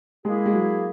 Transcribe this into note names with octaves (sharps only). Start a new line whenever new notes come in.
G#3 A#3 E4 G#4
G#3
F#3